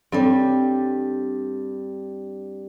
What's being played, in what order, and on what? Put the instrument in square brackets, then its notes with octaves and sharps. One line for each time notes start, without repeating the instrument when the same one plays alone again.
[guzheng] G2 G3 [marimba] C4 A4 C#5